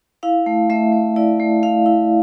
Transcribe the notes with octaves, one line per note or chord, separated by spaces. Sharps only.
E4 F5
A3
A3 E5
A3
E4 D5
A3
E4 F5
E4